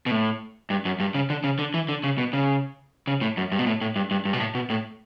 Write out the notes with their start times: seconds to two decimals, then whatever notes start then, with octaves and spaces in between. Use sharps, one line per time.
0.06 B2
0.11 A2
0.70 G2
0.85 F#2
1.00 G2
1.14 C#3
1.30 D3
1.44 C#3
1.59 D3
1.74 E3
1.89 D3
2.04 C#3
2.18 B2
2.33 C#3
3.07 C#3
3.21 A2
3.37 F#2
3.52 G2
3.59 B2
3.66 A2
3.81 A2
3.96 G2
4.11 G2
4.25 G2
4.33 B2
4.40 A2
4.55 B2
4.70 A2